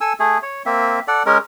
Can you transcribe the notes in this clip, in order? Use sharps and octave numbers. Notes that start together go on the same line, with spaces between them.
A4 G#5 E6
A3 G#4
C#5
A#3 C4 E5
A4 D5 F#5
G#3 C#4 A#4